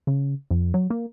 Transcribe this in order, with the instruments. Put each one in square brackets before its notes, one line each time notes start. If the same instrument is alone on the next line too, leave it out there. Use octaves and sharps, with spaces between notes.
[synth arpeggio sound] C#3
F2
F#3
A#3